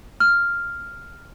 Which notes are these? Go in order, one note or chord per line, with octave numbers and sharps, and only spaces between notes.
F6